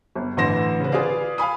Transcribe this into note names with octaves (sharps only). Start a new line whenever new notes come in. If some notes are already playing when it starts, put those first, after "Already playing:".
G1
A1 D3 E3 C6 A#6 E7
C#3 B4
F4 G#4 B4 D5 F5
F5 G#5 B5 D#6